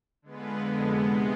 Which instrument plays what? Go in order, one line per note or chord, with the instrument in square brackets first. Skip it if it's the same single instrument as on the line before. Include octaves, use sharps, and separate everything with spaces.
[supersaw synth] D3 G#3 B3 F4 B4
F2 D3 F3 G#3 B3
C3 G#3 B3